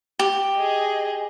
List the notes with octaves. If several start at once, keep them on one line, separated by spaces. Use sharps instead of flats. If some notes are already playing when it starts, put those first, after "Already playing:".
G4
G#4 D#5